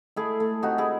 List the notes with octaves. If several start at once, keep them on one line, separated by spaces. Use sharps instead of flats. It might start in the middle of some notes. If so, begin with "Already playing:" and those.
A3 E4 G#4
A3
C3 D#4 F#4
E4 G#4